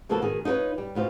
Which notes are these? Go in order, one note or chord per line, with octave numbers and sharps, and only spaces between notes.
C#3 F3 A#3 B3 F#4 A4
B2 D#3 G#4
D#4 F4 A#4 B4 C#5
G3
D2 B2 F4 C5